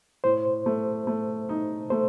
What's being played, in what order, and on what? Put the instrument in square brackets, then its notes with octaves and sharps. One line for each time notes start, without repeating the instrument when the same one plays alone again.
[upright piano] A2 [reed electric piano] C5
[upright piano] A3
A3
D#4
[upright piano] A3 [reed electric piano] C5